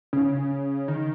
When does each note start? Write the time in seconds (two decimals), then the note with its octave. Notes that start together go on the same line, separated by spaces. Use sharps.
0.13 C#3
0.88 D#3